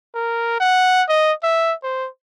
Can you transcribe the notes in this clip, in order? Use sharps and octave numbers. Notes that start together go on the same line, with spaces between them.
A#4
F#5
D#5
E5
C5